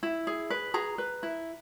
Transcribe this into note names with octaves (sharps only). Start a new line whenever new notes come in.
E4
G#4
B4
G#4 A#5
B4
E4